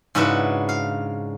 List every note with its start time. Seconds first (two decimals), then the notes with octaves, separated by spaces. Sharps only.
0.15 G#2 C#3 D4 E4 F#4 B4
0.69 F5